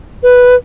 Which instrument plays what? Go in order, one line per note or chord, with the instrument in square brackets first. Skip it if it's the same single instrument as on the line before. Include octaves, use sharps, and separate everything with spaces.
[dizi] B4